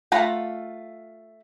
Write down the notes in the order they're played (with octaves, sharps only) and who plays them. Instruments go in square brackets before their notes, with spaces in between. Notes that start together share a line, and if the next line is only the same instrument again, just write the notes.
[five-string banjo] A3 F4 F#5 A#5 B5